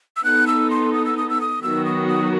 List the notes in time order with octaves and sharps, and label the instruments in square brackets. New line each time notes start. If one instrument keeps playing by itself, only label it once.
[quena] E6
[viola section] B3 D#4 A4 [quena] F#6
[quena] E6
C6
D#6
E6
D#6
E6
D#6
[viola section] D#3 F#3 B3 F#4 [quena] E6
[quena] D#6
D#6